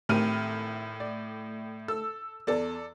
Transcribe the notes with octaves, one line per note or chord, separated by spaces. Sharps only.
G#1 A2 A3 G4 A#4 F6 D#7
D5
A4 E6
E2 A4 D5